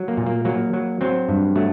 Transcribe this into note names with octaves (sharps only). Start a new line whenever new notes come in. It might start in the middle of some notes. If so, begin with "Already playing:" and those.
Already playing: F#3
A#3
A#2
A#3
F#3 A#3
F#3
F#3 C4
G2
F#3 A3